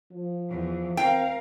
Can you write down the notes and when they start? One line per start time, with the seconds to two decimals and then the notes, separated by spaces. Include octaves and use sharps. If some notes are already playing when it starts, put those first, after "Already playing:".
0.12 F3
0.49 E2
0.97 C4 A#4 F5 G5